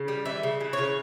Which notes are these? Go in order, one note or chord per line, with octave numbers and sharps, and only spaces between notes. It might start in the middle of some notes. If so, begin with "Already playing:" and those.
Already playing: C#3
G3
E3 E5
C#3
E3
C#5
C#3